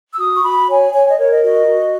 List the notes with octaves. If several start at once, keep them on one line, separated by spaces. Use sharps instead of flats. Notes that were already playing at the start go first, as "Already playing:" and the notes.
E6
F#4 D#6
C#6
F#4 B5
C#5 G#5
C#5 G#5
D#5
A#4 C#5
D#5
F#4 D#5
F#4